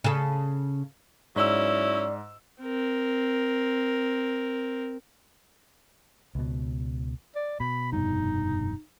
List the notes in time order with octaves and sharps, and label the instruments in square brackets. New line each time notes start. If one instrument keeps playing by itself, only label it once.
[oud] C#3 A4
[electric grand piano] G#2 E6 [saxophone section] F#3 C#4 E4 [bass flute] D5
[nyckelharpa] C4 A#4
[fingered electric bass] C#2 B2
[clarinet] D5
[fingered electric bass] B2 [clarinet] B5
[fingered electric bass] F1 G2 B2 [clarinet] D#4